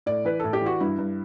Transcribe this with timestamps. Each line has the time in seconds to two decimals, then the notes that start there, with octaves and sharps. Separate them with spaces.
0.06 A2 D5
0.25 E3 B4
0.40 A2 A4
0.53 G4
0.61 E3 F#4
0.80 G2 E4
0.99 G2